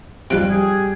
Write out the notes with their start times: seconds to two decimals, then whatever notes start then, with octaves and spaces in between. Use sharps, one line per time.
0.30 C3 F3 G3 D#4 F#6 D7
0.50 G4 G#4